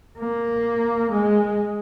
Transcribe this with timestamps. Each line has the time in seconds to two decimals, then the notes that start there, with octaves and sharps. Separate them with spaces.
0.19 A#3
1.12 G#3